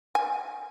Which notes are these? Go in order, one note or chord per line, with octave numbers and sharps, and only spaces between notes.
G#5